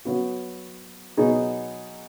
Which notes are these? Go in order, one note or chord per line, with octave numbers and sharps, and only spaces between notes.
F#3 B3 F#4
B2 F#3 B3 D#4 G#4